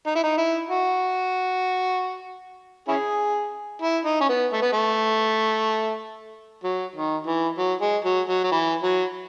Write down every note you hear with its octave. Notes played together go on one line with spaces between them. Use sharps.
D#4
E4
D#4
E4
F#4
C#4 E4 G#4
E4
D#4
C#4
B3
A3
B3
A3
F#3
D#3
E3
F#3
G#3
F#3
F#3
F#3
E3
F#3